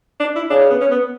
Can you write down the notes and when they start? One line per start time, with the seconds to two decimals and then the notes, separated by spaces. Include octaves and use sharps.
0.20 D4
0.36 E4
0.50 C#3 D4
0.61 C#4
0.71 B3
0.81 C#4
0.91 B3